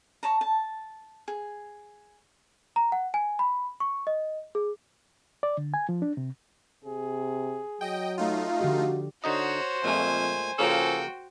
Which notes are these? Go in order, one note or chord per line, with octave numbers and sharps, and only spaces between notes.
C#5 A5 A#5
A5
G#4
A#5
F#5
G#5
B5
C#6
D#5
G#4
D5
D3
G#5
F3
D4
C3
C3 G#4
F#3 D#5 G5
A3 D#4 F4 F5
D3 F3 F#4 G4
D3 D#4 F#4 C5 C#5 D#5
F2 A#2 G#3 A3 G#5
C#3 F3 A#3 C#4 F#4 G#4 A4 G5